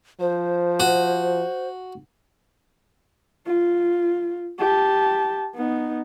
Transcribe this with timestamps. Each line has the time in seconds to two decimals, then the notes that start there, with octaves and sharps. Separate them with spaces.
0.20 F3 C5
0.80 F#4
3.46 F4
4.60 G4 A5
5.56 B3 D#4